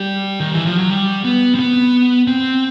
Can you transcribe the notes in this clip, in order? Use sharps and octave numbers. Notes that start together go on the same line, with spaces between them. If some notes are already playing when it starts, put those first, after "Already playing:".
Already playing: G3
D#3
E3
F3
F#3
G3
B3
C4
B3
C4